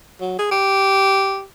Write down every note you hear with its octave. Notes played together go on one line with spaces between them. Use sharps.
F#3
G#4
G4